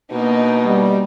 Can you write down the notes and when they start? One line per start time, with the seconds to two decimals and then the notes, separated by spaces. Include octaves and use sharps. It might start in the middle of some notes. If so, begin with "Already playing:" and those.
0.12 B2 A#3 D4 D#4
0.64 G3